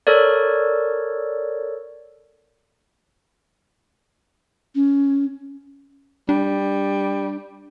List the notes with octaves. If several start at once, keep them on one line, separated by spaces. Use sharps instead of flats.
A4 A#4 C#5 D5
C#4
G3 D4